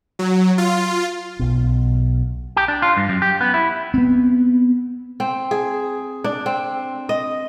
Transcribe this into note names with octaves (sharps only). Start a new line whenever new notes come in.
F#3
F4
B1 B2
G4
D4
F4
G2
F#2
G4
B3
E4
B3 C4
C4
G#4
D4
C4
D#5